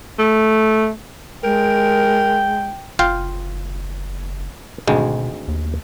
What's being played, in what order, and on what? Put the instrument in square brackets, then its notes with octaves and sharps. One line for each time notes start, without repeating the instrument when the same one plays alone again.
[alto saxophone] A3
[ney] G#3 [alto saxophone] A#4 [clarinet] G5
[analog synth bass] F#1 [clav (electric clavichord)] F4 F5 G5
[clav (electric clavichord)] G#1 D2 G#3 [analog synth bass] B2
[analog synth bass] D#2